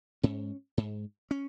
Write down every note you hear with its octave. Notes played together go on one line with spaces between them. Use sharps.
G#2 C#4
G#2
C#4